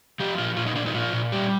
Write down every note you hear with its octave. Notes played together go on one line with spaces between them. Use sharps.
F3 G4
A#2 F4
A#2 F4
D#4
F3 D4
D#4
A#2 F4
A#2
G3 G4